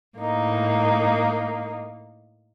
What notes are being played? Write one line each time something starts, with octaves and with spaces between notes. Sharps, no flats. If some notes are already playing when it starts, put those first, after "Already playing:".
A2 A#3 D#4